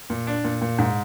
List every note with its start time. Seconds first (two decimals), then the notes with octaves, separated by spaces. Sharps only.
0.10 A#2
0.27 D4
0.44 A#2
0.62 A#2
0.79 G#2